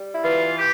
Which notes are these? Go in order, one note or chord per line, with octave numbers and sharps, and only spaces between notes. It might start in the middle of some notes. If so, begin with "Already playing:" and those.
Already playing: G3
E4
E3 F4
G4